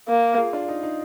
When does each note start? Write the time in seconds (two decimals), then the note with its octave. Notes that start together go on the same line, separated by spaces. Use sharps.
0.08 A#3
0.38 F4 G#4
0.53 D4 F4
0.68 D#4
0.83 D#4